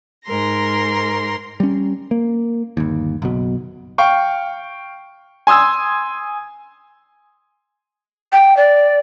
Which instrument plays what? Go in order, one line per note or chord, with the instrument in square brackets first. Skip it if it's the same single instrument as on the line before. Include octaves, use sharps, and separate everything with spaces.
[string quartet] G#2 A#4 C6 A#6
[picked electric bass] G3 C#4
A#3
G1 D#2
F#1 B1 B2
[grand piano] F5 G5 C#6
G#5 C6 D#6 E6 G#6
[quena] G5
D5